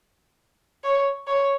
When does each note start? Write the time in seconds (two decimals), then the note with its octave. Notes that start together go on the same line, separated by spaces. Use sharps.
0.84 C#5
1.27 C#5